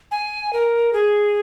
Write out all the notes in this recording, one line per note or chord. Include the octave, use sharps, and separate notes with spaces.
G#5
A#4
G#4